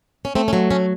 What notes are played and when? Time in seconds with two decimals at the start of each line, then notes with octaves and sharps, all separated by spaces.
0.25 C#4
0.35 A3 C4
0.48 C#4
0.53 F#3 C4
0.71 A3 C#4